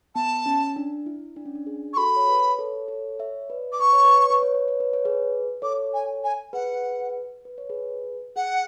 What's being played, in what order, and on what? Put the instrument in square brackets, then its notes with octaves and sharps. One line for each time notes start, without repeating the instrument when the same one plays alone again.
[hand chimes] B3 [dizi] A5
[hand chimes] C#4
D4
E4
D4
C#4
D4
G#4
[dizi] C#6
[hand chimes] F#4 A4 [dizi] B5
[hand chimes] C#5
G#4 B4
A4 C#5
A4 C#5
C#5 E5
B4 D5
[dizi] D6
[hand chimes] B4 [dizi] C#6
[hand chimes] C#5
B4
C#5
B4
C#5
B4
C#5
B4
C#5
G#4 B4
[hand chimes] A4 C#5 [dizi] D6
[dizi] G#5
G#5
[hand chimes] G#4 B4 [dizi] F#5
[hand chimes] B4
C#5
G#4 B4
[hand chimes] G#4 [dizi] F#5